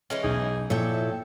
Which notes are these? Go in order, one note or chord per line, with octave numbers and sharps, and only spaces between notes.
E3 G#3 C#4
B1 G#4
A#2 F3 E4 A4 C#5 E5 G5